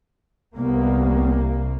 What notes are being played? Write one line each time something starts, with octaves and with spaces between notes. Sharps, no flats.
C2 A#3 B3